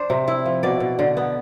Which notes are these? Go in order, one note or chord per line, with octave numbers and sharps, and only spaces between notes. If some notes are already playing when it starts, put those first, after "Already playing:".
Already playing: D4 C5
C3
E4
F3
B2 D5
B2
D3
B3